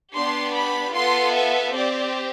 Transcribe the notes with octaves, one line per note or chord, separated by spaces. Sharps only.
B3 D4 G4 C6
B5
B3 F4 A4 C6
E5
C4 G4 D5